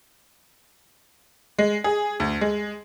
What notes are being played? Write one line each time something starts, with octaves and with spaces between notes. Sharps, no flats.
G#3
G#4
D2
G#3